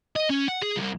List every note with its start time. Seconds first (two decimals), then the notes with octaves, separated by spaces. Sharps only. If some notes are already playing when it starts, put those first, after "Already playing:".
0.16 D#5
0.30 C#4
0.48 F#5
0.62 G#4
0.76 C2